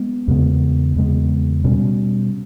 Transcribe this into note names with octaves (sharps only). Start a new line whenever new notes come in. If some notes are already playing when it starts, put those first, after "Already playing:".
Already playing: G#3 B3
E2 C#3 G#3 B3
E2 C#3 G#3 B3
B2 G3 C#4